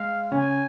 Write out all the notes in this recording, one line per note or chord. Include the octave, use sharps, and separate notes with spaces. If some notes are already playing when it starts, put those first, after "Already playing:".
Already playing: G#3 F5
C#3 C#4 G#5